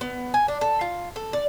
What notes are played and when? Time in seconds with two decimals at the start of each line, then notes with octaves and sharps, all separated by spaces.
0.01 B3
0.34 G#5
0.48 D4
0.61 A4
0.81 F4
1.16 A4
1.33 D5